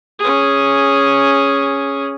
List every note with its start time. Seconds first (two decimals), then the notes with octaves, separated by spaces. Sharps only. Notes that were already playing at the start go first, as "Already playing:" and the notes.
0.19 C#4 G#4